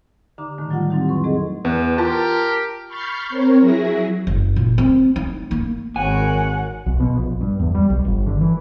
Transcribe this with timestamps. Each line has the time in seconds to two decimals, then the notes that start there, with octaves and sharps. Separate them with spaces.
0.38 D3 D#4 G4 A#5 D6
0.58 A2 D3 D#3 A3
0.70 F#3 G3 D#4 F4 G4 F#5
0.90 F#3 C4 D#4 E4 G4
1.09 F2 B4 C6 C#6
1.24 A3 C4 G#4 A4 D#5
1.65 E2 B4
1.98 F4 G4 A#4 A5
2.87 B5 C#6 F6 G6 A6 C7
3.30 C4 A#4 C#5
3.60 F#3 E4 G#4 A#6
4.27 F#1
4.56 A#2
4.78 C4
5.16 D#4
5.51 A#3
5.96 G#1 F#4 A#4 C#5 F#5 G#5
6.86 B1
7.00 B2
7.17 A#1
7.41 G2
7.60 E2
7.75 G3
7.90 B1
8.05 G1
8.26 D3
8.41 E3